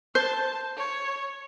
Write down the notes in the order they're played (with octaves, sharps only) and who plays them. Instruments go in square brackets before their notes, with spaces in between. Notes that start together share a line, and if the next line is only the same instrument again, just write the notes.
[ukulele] C5 [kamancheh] A5
[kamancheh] C#5